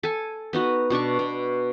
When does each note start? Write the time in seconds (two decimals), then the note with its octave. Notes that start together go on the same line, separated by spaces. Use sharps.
0.03 A4 G#5
0.53 B3 D#4 F#4
0.90 B2 D4 D5 C#6
1.19 B2